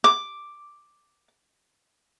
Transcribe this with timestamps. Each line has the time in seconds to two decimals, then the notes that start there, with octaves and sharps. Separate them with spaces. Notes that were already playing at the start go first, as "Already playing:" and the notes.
0.04 D6